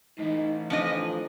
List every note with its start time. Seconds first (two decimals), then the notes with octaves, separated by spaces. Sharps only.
0.19 A2 E3 D#4
0.70 F2 F3 D4 D#5